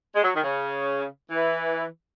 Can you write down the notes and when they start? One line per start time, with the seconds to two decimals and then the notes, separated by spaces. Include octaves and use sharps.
0.13 G#3
0.23 F#3
0.34 D#3
0.43 C#3
1.31 E3